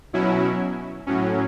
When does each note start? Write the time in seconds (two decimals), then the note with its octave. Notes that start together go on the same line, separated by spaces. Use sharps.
0.13 B2 F#3 C#4 E4
1.07 A2 F#3 C#4